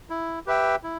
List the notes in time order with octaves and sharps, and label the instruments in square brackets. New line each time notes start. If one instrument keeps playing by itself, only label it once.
[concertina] E4
G4 B4 E5 G5
E4